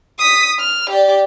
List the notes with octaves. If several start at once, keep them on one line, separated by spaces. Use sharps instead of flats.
D#6 B6
F6
G4 D5